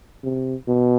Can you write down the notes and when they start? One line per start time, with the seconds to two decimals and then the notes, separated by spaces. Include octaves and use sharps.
0.24 C3
0.68 B2